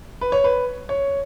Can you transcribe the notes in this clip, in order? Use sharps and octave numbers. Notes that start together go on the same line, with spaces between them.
B4
C#5
B4
C#5